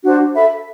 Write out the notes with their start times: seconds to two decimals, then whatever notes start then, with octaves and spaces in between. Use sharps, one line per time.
0.04 D4 F#4 C5
0.35 A4 E5 B5